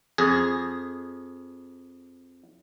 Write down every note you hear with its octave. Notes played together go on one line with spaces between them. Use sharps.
F2 G#4